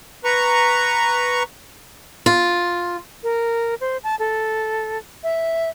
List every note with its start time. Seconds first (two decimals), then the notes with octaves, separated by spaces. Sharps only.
0.25 B4 A#5 C#6
2.26 F4
3.24 A#4
3.81 C5
4.04 A5
4.19 A4
5.24 E5